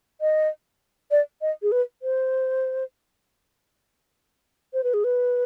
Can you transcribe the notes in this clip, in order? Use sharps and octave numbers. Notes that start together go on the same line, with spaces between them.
D#5
D5
D#5
G#4
B4
C5
C5
B4
G#4
B4